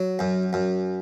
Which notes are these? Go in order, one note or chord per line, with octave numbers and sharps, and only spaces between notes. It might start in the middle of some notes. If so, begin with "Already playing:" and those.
Already playing: F#3
F#2
F#2